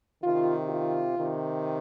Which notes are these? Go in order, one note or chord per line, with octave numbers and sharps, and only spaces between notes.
C3 D#3 F4
F4
C3 D#3